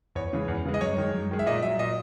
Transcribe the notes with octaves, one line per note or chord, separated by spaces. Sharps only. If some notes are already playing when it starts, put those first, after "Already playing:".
E2 C#5
C#3 E3 G#3
E2
C#3 E3 G#3
D#5
F#2 C#5
D#3 G#3
F#2
D#3 G#3
E5
A#2 D#5
F#3 E5
A#2 D#5